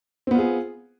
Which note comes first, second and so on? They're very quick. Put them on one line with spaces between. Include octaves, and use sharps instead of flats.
C4 B3 F4 G#4